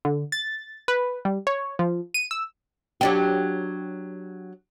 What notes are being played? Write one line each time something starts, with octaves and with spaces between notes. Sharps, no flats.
D3
A6
B4
G3
C#5
F3
D#7
E6
F#3 D4 G4